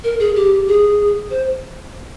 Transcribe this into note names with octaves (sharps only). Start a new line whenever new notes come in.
A#4
G#4
G4
G#4
C5